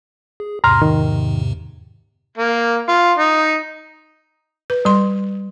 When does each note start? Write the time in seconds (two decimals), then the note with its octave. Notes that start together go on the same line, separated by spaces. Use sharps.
0.40 G#4
0.64 E2 G#2 C3 A#5 C6 F6
0.82 D#3
2.38 A#3
2.89 F4
3.18 D#4
4.70 B4
4.85 G3 C6